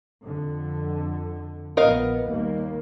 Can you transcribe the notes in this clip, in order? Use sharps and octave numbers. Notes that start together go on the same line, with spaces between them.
F2 D3
A#1 B3 A#4 D#5 F5
D#2 G3 A#3